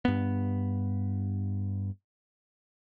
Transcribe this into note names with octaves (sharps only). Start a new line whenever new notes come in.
G2 B3